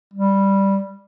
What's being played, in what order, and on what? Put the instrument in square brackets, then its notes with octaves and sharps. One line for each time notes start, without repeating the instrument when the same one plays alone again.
[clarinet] G3